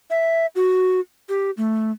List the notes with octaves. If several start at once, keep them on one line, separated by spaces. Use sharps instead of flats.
E5
F#4
G4
A3